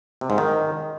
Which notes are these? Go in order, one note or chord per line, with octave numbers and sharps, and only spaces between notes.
C3
G#2
D#3